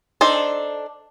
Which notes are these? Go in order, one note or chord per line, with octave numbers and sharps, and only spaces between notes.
D4 D#4 A4 C5